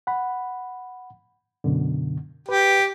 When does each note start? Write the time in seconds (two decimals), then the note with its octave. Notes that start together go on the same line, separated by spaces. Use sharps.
0.07 F#5 B5
1.64 F#2 B2 D3
2.49 G4 B4